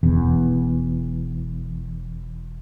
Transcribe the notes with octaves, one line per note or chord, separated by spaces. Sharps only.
E1 E2